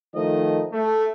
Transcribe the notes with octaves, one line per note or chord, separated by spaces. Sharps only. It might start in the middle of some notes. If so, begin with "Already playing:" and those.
D#3 F3 A3 D#5
A3